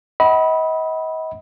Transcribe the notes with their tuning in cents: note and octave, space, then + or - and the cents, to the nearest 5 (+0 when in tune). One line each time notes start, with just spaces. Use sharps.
D#5 +40 F#5 +25 B5 -15